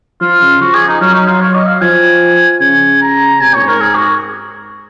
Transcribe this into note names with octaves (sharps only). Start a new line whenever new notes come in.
F3 F4
C#3
F3 F#4
G#4
D#4
F#3 C#4
D#4
F4
C#5
D#5
F5
F3 G#5
C#3 G#5
A#5
C3 G#5
A#2 C#5
G#2
A#4
G#4
F#4